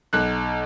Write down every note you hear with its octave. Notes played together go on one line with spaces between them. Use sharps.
B1 F#6